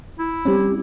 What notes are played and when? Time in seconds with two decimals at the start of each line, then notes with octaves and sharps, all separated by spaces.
0.19 E4
0.45 G3 C4 C#4 G4